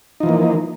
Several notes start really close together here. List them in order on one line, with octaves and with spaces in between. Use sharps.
D#4 F3 E3 A#3